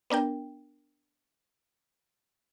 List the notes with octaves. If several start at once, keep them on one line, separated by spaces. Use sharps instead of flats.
B3 D4 A#4 G5